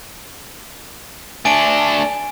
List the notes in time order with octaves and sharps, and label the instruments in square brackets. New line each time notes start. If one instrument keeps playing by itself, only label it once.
[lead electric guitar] A3 D4 [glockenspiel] G#5 D7